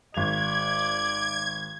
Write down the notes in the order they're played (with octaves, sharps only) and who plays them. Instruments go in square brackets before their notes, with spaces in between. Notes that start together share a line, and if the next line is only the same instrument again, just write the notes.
[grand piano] G#1 F7 [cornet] D5 [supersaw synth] G#6